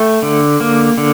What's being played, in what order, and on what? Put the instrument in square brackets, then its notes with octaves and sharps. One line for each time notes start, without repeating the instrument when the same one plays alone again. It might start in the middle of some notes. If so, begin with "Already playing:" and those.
Already playing: [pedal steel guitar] A3 G5
D3
A#3
D3